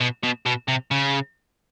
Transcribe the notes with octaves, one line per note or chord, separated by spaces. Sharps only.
B2
B2
B2
C3
C#3